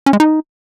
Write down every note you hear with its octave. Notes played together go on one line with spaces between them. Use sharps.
C#4
G#3
D#4